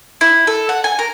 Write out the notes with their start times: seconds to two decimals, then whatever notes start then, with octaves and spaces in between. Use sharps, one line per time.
0.21 E4
0.47 A4
0.69 F#5
0.84 G#5
0.99 A#4